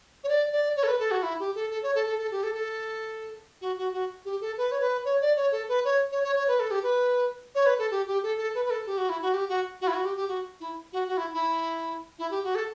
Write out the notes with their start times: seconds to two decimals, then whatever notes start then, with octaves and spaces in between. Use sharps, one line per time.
0.23 C#5
0.28 D5
0.52 D5
0.76 C#5
0.83 A4
0.87 B4
0.99 A4
1.11 F#4
1.23 E4
1.39 G4
1.55 A4
1.70 A4
1.83 C#5
1.95 A4
2.06 A4
2.18 A4
2.31 G4
2.43 A4
2.54 A4
3.61 F#4
3.77 F#4
3.93 F#4
4.25 G4
4.41 A4
4.57 B4
4.71 C#5
4.80 B4
5.05 C#5
5.21 D5
5.36 C#5
5.51 A4
5.68 B4
5.84 C#5
6.11 C#5
6.23 C#5
6.35 C#5
6.47 B4
6.59 A4
6.70 G4
6.83 B4
7.55 C#5
7.66 B4
7.78 A4
7.91 G4
8.07 G4
8.23 A4
8.37 A4
8.54 B4
8.65 B4
8.70 A4
8.86 G4
8.97 F#4
9.09 E4
9.22 F#4
9.33 G4
9.49 F#4
9.81 F#4
9.87 E4
9.93 F#4
10.05 G4
10.16 G4
10.28 F#4
10.60 E4
10.92 F#4
11.07 F#4
11.17 E4
11.33 E4
12.18 E4
12.30 G4
12.43 F#4
12.55 A4